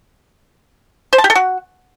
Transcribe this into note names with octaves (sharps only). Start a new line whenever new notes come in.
C5
A5
G4
A4
F#4